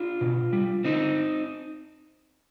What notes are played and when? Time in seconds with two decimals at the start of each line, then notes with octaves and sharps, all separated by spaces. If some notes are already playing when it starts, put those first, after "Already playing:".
Already playing: D4 F4
0.21 B2
0.53 G3
0.84 D3 C4 D#4